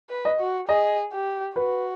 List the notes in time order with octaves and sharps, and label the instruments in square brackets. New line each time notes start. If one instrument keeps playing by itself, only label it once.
[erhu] B4
[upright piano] D#5
[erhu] F#4
[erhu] G#4 [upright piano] D#5
[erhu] G4
[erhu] F#4 [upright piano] B4